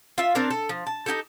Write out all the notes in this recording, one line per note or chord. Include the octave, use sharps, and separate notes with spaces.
F4 E5
C4 D4 A#4 D5
A4
F3
A5
D#4 E4 G4 A4